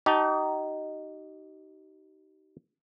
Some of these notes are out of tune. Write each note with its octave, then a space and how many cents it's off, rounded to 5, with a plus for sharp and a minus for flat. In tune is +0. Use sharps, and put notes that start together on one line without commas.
D#4 +0 G4 -40 A5 +0